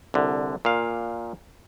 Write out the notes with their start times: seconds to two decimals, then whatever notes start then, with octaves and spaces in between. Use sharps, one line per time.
0.14 C2 D3
0.65 A#2 F5